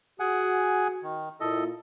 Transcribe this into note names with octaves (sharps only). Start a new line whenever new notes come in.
F#4 G#4 F#5 G#5
D#3
A#2 E4 A4 D#5